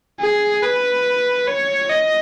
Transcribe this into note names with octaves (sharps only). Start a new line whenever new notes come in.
G#4
B4
C#5
D#5